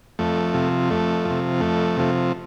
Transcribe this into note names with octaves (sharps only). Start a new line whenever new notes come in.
F2 A3
C3 F3
F2 A3
C3 F3
F2 A3
C3 F3